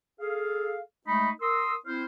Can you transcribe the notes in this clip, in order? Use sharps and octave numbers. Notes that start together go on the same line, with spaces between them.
G#4 A4 F5
G#3 A3 D#4 B5
A#4 C6 D#6 E6
C4 E4 C5 F6